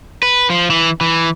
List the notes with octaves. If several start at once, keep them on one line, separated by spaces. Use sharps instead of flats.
B4
F3
E3
E3